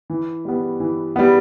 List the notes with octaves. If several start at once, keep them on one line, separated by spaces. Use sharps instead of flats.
E3
G3 B3
E3
G3 B3